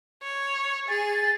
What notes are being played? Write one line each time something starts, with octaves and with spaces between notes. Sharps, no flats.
C#5
G#4 A6